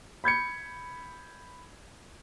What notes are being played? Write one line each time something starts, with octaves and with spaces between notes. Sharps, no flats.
B5 G6 G#6 C#7